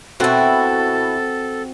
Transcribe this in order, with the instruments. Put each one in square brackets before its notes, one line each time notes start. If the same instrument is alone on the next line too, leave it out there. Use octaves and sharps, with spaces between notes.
[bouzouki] B2 E4 [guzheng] C4 F#4 [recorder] A4